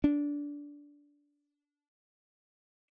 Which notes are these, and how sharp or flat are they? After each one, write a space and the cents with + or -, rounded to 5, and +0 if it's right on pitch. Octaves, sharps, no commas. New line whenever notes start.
D4 -15